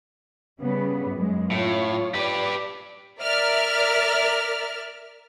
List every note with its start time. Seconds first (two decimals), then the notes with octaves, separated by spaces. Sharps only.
0.60 C#3 G3 B3
1.10 F#2 G#3
1.51 A2 F4 C#5
2.15 G4 B4 D5
3.21 A#4 D5 E5 F6